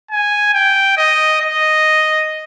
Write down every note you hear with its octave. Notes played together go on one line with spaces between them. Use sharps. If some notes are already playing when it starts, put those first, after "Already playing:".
G#5
G5
D#5
D#5